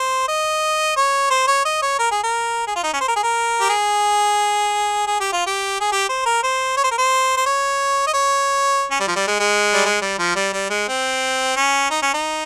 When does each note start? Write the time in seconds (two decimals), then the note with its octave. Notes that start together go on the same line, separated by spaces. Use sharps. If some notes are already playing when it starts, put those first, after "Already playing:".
Already playing: C5
0.28 D#5
0.97 C#5
1.30 C5
1.47 C#5
1.65 D#5
1.82 C#5
1.99 A#4
2.11 G#4
2.23 A#4
2.67 G#4
2.76 F4
2.84 D#4
2.93 C#4
3.01 C5
3.08 A#4
3.16 G#4
3.23 A#4
3.61 G4
3.70 G#4
5.07 G#4
5.20 G4
5.32 F4
5.47 G4
5.81 G#4
5.92 G4
6.09 C5
6.26 A#4
6.44 C5
6.77 C#5
6.84 C5
6.91 A#4
6.98 C5
7.37 C5
7.46 C#5
8.07 D#5
8.14 C#5
8.91 C#4
9.00 G3
9.08 F3
9.16 G3
9.28 G#3
9.40 G#3
9.74 G3
9.86 G#3
10.02 G3
10.19 F3
10.36 G3
10.53 G3
10.70 G#3
10.88 C4
11.56 C#4
11.91 D#4
12.02 C#4
12.14 D#4